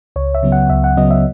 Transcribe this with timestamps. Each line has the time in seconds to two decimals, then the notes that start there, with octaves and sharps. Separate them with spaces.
0.16 C#2 C#5
0.35 E5
0.43 C#3 F#3 B3
0.52 F#5
0.70 C#2 E5
0.84 F#5
0.97 C#3 F#3 B3 D#5
1.11 E5